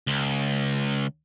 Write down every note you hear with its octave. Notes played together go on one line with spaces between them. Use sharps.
C#2